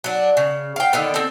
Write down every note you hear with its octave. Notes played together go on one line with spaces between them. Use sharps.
F#3 D4
C#3
F5 G5
D3 D#3 B3
C4 A4